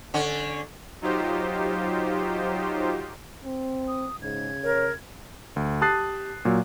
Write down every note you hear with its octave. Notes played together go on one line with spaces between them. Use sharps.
D3 C#4
F#3 D#4 F4 G4 C5
C4
D#6
G#2 C#3 G#6
A#4 C#5
D2
G4 A5 D#6 F#6 A6 C7
A#2 F#3